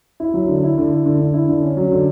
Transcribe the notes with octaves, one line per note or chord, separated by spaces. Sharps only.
E4
F#3
D3
E4
D3
E4
D3
D3
E4
D3
C#4
F#3
D3